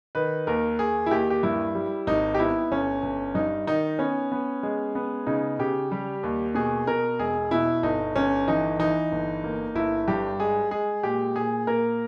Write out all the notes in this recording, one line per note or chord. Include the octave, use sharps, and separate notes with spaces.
D#3 B4
D#2 A#4
D#2 G#4
E4
D#2 G4
G4
G2 E4
G3
G#1 D#4
G4
B3 E4
G1 C#4
G1
G2 D#4
D#3 D#4
B3 C#4
B3
G#3
B3
C#3 D#4
C#3 G4
G3
D#2
B2 G#4
B2 A#4
E1 G#4
B2 E4
G1 D#4
G1 C#4
E3 D#4
E3 D#4
G1
A#3
G1 E4
G2 G4
G#3 G#4
G#3 G#4
A#2 G4
A#2 G#4
A#3 A#4